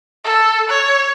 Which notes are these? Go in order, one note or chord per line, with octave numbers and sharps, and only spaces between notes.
A4
C#5